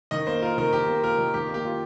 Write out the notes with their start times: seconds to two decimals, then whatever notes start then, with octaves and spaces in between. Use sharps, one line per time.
0.11 D#3 D#5
0.27 A#3 C5
0.42 F4 A#4
0.58 D#3 A#4
0.73 D#3 G4
0.88 A#3
1.03 F4 A#4
1.18 D#3
1.34 D#3 G4
1.49 A#3
1.54 G4
1.65 F4